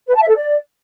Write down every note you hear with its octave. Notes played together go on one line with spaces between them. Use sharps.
B4
A5
E5
A4
D5